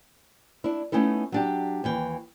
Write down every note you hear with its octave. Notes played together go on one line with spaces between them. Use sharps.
D4 E4
A3 B3 C#4 D#4 E4 A4
F#3 D4 G4
D#2 E3 G5